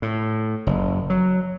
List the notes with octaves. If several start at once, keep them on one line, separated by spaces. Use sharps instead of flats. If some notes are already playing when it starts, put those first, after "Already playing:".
A2
F#1
F#3